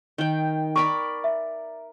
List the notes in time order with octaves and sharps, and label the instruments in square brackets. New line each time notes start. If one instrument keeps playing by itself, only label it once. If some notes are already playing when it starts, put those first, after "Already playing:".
[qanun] D#3 G5
[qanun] A#4 D5 B5 [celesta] C#6
[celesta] E5